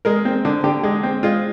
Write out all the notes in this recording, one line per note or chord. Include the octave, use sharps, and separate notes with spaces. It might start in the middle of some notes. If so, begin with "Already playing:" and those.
G#3 A#4
C4
D3
D3 G4
G#3
C4
G#3 F4